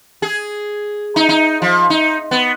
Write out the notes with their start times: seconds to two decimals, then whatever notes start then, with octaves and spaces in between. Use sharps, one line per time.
0.22 G#4
1.16 D#4
1.29 D#4
1.62 F3
1.90 D#4
2.31 B3